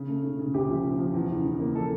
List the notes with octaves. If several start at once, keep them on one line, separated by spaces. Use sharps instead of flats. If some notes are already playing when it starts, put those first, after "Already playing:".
Already playing: C#3
A3
C#3
C#3
D2 G4
F3
C#3
F3
E2
C#3
C#3
A#3
F3 A4